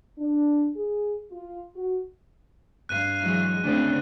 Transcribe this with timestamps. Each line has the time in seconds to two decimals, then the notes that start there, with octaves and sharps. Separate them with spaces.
0.18 D4
0.76 G#4
1.31 F4
1.76 F#4
2.89 G2 F5 F#6 D#7
3.21 E3 F#3 G#3
3.63 D2 C#3 C4 D4